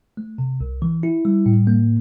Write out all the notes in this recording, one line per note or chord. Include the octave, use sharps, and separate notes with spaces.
A3
C3
C2
E3
E4
G3
A2
A#3